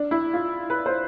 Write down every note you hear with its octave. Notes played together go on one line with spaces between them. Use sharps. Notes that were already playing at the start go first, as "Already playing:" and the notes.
Already playing: D4
E4
F4
B4
C5